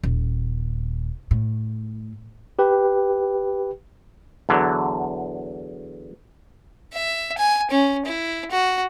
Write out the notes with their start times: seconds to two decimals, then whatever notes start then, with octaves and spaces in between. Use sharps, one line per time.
0.04 D#1
1.31 A2
2.59 G4 B4 G5
4.49 E2 D3 F#3
6.93 E5
7.38 G#5
7.71 C#4
8.05 E4
8.51 F#4